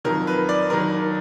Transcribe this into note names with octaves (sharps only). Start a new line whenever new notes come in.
F2 D#3 F#3 A#4
B4
D5
D#3 F#3 A#4